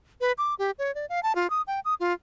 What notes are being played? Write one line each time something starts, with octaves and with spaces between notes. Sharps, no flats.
B4
D6
G4
C#5
D5
F5
A5
F4
D#6
G5
D#6
F4